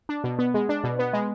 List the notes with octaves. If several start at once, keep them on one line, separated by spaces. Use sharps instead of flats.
D4
B2
B3
G#3
D4
B2
B3
G#3